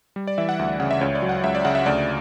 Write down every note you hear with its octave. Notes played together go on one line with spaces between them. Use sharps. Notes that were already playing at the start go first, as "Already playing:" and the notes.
G3
D5
E3 E5
F#5
D2
F#5
C#3 F#5
E5
C#2 C#5
D5
F#3
F#5
C#2 E5
D5
C#3 F#5
E5
D2 D5